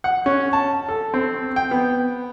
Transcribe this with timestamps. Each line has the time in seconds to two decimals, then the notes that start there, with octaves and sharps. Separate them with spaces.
0.04 F#5
0.26 C#4
0.53 A5
0.89 A4
1.14 C4
1.56 G5
1.71 B3